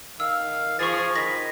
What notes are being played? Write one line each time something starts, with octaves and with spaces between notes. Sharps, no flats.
D#3 F5 E6
F3 G#4 C#6 A6
D#3 B5 A#6